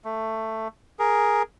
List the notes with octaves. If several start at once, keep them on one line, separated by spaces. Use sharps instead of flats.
A3
G#4 A#4